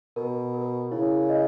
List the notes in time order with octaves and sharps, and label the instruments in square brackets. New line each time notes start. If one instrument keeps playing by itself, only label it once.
[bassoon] B2 [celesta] A#4
[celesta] A#4
[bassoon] C#3 [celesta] E4
[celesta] D#5